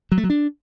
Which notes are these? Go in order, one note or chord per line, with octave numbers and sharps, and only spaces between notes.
F#3
A3
F#3
D4